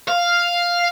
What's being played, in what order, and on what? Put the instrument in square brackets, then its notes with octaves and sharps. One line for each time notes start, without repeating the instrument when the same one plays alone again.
[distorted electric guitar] F5